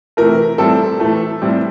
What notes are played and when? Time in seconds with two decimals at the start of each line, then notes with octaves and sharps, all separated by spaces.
0.17 C3 E3 A3 A#4
0.58 A2 G3 C4 A4
1.00 A2 E3 A3
1.42 A2 G3 C4